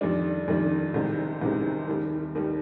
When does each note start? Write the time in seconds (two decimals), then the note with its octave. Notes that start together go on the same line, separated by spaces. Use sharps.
0.01 F2 D#3 G3 D4
0.48 F2 D#3 G3 D4
0.94 C2 C3 D#3 G#3
1.41 C2 C3 D#3 G#3
1.88 D#2 D#3 G3
2.35 D#2 D#3 G3